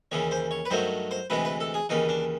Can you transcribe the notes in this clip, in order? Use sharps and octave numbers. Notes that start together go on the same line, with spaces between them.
D#2 C#3 E3 C#5
C5
C#5
B4
G2 D#3 F#3 A3 C5
C5
D2 C3 E3 G#3 B4
B4
A4
G#4
D#2 C#3 E3 D#4
D4